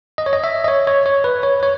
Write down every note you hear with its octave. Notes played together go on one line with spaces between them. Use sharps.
D#5
C#5
D#5
E5
D#5
C#5
C#5
C#5
B4
C#5
C#5